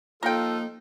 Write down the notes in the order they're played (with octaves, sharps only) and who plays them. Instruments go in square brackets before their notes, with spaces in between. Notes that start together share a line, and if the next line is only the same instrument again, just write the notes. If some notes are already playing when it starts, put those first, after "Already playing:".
[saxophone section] F3 D#4 F4 [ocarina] A#3 [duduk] A4 [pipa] A#4 G5